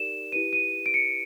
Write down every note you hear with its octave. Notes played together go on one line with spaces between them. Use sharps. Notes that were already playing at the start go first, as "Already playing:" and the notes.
Already playing: D#4 G4 A#4 D5 E7
E4 G4 B4 D#7
D#7
D7
C#7